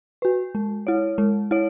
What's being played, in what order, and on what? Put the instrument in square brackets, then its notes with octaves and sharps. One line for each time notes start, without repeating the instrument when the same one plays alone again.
[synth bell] F#4 B4
G#3
E4 C#5
G#3
E4 C#5